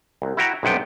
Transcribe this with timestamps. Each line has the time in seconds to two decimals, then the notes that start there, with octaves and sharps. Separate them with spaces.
0.22 C2
0.37 E4 F#4 G5 A#5
0.63 B1 G2 C3 B3 G5